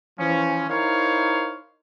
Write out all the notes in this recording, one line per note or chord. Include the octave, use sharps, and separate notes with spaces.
E3 F3 C#4
D#4 E4 A#4 C5 C#5 F5